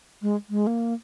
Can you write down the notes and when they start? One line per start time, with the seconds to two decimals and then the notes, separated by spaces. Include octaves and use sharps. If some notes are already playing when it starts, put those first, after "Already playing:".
0.22 G#3
0.50 G#3
0.67 A#3